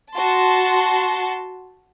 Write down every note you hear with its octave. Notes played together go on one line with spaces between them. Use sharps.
F#4 A5 C6